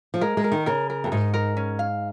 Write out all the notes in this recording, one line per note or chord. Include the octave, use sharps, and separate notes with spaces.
F3
G#3 A#4
G#3
A#4
D#3
C#3 A#4
A#4
F2
G#2 D#4
A#4
C#4
F5